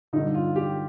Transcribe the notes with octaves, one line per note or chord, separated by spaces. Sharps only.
G2 D3 D#4
F4
G4